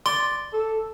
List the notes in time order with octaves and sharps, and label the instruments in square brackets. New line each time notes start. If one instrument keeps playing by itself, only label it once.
[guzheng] D5 [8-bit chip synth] C6
[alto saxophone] A4